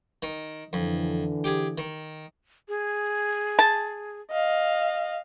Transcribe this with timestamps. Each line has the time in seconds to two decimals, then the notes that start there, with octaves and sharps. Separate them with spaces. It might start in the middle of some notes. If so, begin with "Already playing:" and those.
0.22 D#3
0.73 F2 D3 E3
1.44 G4 G#4
1.78 D#3
2.68 G#4
3.59 A5
4.31 D#5 F5